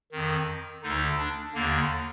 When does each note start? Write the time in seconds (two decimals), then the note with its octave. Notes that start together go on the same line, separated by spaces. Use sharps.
0.12 F2 D#3
0.82 D2 D3 D#4
1.18 D4
1.54 D#2 D3 A#3